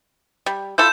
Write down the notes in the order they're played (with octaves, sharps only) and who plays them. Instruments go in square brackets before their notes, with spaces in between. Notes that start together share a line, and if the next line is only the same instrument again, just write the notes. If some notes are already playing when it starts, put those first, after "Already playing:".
[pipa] G3
[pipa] E4 F4 A4 [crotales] G6 E7